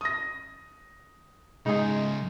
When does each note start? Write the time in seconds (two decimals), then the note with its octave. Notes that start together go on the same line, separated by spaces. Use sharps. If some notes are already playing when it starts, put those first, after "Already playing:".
0.01 D#6 A#6
1.66 G#2 C#3 G#3 D#4 G#4